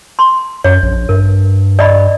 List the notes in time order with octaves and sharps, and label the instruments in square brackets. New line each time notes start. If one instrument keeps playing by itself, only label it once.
[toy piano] C6
[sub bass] F#2 [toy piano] C#5
[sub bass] A#1
[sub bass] G2 [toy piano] A#4
[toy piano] D5 D#5 B5